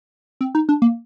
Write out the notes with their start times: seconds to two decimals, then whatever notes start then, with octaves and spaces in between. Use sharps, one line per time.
0.41 C4
0.55 D#4
0.69 D4
0.82 A#3